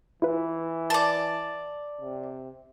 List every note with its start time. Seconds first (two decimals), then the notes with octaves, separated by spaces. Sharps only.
0.22 E3 E4 F4 B4
0.90 D5 A5
2.01 C3